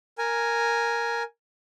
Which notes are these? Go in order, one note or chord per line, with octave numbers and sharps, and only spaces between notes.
A#4 G#5